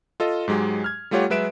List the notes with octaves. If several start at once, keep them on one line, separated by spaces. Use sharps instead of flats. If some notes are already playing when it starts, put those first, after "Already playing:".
F4 A4 D#5
G#2 F#3 G#3 G4 G#5
F6 G#6
G3 A3 F4 G4 C#5 F#5
F#3 G#3 B4 E5 D7 E7